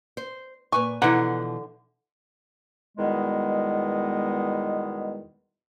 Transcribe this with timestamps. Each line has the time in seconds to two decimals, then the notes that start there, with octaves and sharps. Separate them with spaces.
0.17 C5
0.72 A#2 B4 G#5 C#6
1.02 B2 D3 E3 F3 E4 B4 F#5 A#5
2.98 E2 B2 D#3 G3 G#3 B3